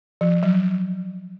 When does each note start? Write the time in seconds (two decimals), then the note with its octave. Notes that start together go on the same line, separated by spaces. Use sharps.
0.21 F3
0.43 F#3